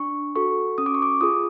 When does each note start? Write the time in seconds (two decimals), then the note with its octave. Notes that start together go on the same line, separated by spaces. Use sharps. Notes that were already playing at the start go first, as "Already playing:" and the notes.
Already playing: D4 C#6
0.36 F#4 A4 C#6
0.78 C#4 D#6
0.86 D6
0.94 C#6
1.02 D6
1.21 F4 G#4 D#6